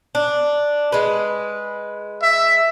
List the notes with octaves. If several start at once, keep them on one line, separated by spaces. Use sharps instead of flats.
D4
G#3 B4
E5